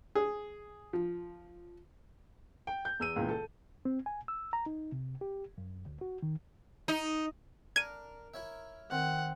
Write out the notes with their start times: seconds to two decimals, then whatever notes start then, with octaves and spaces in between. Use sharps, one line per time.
0.15 G#4
0.93 F3
2.67 G5
2.85 G6
3.00 E2 E6 D#7
3.16 C#2 A#2 E3
3.29 A4
3.85 C4
4.06 G#5
4.28 E6
4.53 A#5
4.66 D#4
4.92 C3
5.21 G4
5.58 F#2
5.86 D2
6.01 F#4
6.22 D#3
6.88 D#4
7.76 D4 A#4 G#6 D#7
8.34 E4 C#5 E5
8.91 D#3 C4 F#5